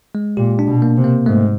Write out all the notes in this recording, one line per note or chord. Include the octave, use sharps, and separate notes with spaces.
G#3
A#2 G4
D4
B2
A#3
C3
A#3
G#2 A3